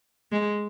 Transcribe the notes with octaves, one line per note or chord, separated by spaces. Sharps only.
G#3